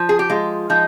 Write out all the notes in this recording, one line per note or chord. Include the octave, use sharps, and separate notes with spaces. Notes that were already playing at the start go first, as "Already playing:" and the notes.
Already playing: F3
G#4
G4
G#3 F4
F3 D#4